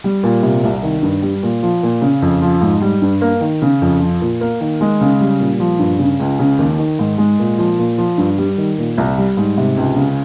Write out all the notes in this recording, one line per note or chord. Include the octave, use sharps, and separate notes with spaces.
G3
A#2
C3
C2
D#3
G2
G3
A#2
F3
A#2
C#3
F2
F3
G#2
G3
G2
A#3
D#3
C#3
F2
F3
A#2
A#3
D#3
G#3
C#3
G3
A#2
F3
G2
C#3
C#2
C#3
D#2
D#3
G#2
G#3
A#2
F3
A#2
F3
G2
G3
D#3
A#2
C2
G3
G#2
C3
C#2
C#3